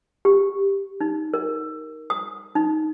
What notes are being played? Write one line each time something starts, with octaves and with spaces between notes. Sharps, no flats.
G4
D#4
A#4
D#6
D#4